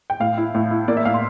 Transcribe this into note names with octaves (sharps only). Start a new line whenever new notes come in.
G5
A2 F5
E4
A2
E4
A#3 D5
E5
A2 F5
C6